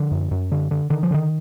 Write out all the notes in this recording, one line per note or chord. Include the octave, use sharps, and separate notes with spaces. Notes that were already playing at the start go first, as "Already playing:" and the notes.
Already playing: D3 F3
F#2
F#2
D3
D3
D3 D#3
F3
D3 D#3